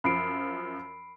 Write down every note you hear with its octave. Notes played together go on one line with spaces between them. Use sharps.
F#2 F3 B5 C7 D7